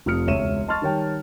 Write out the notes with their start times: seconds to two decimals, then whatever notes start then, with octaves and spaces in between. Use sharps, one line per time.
0.06 F1 F3 D#6 F6 C#7
0.27 E1 C#2 C#5 E5 D#7 E7
0.68 D#5 A5 C6 C#6 F6 A6
0.82 D#3 G3 C#5 G5 A5